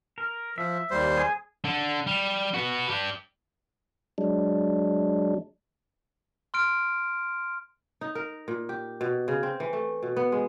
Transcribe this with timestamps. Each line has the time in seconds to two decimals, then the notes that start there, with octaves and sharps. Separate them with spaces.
0.18 A#4
0.58 F3 E5
0.91 D#2 G3 C5
1.17 G#4
1.64 D3
2.07 G3
2.54 F#4 B4
2.89 D4 G4
4.18 F#3 G#3 D4
6.54 C6 F6 D7
8.01 D#4
8.15 A#4
8.48 A#2
8.69 G4
9.01 B2
9.28 C#3
9.43 C4
9.60 E3
9.73 A3
10.03 B2
10.17 B3
10.32 G#3